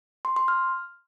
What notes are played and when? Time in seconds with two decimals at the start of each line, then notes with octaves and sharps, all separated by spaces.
0.25 C6
0.36 C6
0.48 F6